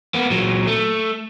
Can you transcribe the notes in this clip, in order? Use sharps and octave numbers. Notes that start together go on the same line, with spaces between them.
A#3 B3
A#2 F#3
A3